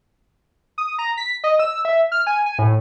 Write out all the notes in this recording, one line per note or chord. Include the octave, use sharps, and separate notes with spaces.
D#6
A#5
B6
D#5
E6
E5
F6
G#5
G#5
A2